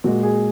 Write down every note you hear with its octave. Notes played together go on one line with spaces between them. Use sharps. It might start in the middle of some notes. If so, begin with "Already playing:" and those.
A#2 G#3 F#4
G#4